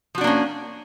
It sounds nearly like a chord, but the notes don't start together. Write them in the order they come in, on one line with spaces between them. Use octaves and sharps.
F3 F#4 D4 A#3 C#4